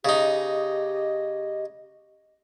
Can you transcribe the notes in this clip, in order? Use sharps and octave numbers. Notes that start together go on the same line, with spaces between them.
C#3 D#4 G4 D#5